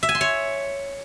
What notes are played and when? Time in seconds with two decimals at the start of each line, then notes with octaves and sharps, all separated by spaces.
0.03 E5
0.09 G#5
0.15 C6
0.21 C#5